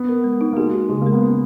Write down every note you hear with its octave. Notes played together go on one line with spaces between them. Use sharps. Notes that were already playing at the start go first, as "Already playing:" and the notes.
Already playing: B3
A#4
G#3
D#4
A#3
G#3 F#4
D#4
C#3 G#3
A#3
G#3
B3
C#4